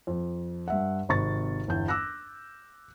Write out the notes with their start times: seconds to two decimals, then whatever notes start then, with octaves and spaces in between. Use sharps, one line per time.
0.07 F2
0.68 G2 E5 F#5
1.09 G#1 C3 C#6 A6
1.67 G1 E2 G6
1.88 D6 E6 F#6 A#6